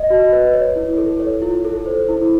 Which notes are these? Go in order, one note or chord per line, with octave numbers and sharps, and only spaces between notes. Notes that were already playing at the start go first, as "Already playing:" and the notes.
Already playing: D#5
F#4
B4
C#5
E4
A4
C#5
F4
A4
C5
E4